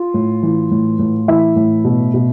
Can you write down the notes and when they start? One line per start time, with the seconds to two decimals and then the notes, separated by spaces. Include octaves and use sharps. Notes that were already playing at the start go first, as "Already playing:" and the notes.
Already playing: F4
0.14 A2
0.43 E3
0.71 A2
0.99 A2
1.28 E3 E4 E5
1.56 A2
1.85 B2
2.14 B2